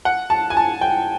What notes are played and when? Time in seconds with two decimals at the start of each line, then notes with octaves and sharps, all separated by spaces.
0.05 F#5
0.30 A5
0.50 G#5
0.57 A5
0.81 G5